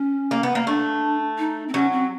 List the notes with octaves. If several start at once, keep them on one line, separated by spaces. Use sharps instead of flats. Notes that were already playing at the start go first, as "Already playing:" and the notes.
Already playing: C#4
A#3
B3
A#3
A3 D4
D#4
C4
F#3 C#4
C4